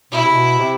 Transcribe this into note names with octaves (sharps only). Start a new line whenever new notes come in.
B2 E4
C3
B2
C3